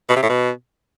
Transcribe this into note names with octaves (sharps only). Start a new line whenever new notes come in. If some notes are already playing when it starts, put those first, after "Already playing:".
B2
C3
A2
B2